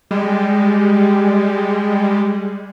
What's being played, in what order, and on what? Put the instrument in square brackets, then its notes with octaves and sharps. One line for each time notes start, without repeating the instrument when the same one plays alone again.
[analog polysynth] G3 G#3